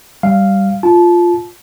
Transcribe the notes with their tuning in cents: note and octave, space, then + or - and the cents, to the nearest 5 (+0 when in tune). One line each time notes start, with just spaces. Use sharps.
G3 -5 F5 -5
F4 +0 A5 -20